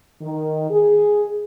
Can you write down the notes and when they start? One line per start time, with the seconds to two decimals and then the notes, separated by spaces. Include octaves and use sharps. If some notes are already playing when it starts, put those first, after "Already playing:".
0.21 D#3
0.70 G#4